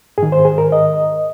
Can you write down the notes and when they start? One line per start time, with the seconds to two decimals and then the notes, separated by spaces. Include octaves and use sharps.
0.18 G#2 D#3 G#4
0.32 C5
0.45 G#4
0.58 A#4
0.72 D#5